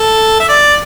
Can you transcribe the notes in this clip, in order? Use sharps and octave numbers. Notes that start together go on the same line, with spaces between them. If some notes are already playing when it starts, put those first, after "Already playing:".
Already playing: A4
E5
D5